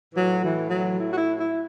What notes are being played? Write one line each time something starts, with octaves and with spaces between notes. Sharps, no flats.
A2 E3 F#3
E3
F#3
E4
F#4
E4
E4